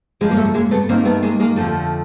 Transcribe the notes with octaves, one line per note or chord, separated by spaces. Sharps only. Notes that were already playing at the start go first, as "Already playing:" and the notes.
F#2 C#3 F3 G#3
A#3
A3
G#3 A#3
A3 B3
G2 D#3 A#3 C4
A3 B3
G#3 A#3
G#3 A#3
F2 D3 F3 A3